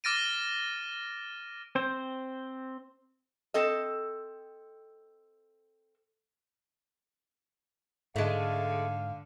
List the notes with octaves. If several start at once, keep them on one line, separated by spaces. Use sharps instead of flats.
D6 F6 A6 A#6 D7 D#7
C4 C5
C4 A4 D#5
G#2 D3 G#3 A3 F5